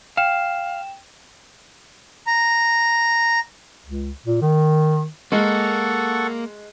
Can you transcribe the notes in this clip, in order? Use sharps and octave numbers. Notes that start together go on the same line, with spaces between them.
F5 G5 E7
A#5
C#2
A#2
D#3
G#3 A#3 A4 F#5 C#6